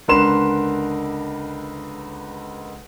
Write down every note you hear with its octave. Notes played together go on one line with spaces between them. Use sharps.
C#2 D3 A#4 B4 C6 E7